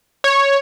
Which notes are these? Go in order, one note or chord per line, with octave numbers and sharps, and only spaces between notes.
C#5